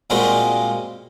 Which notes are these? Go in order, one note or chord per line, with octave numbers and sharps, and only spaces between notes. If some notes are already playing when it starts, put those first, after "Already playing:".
A#2 G3 G#3 A#3 C4 F#4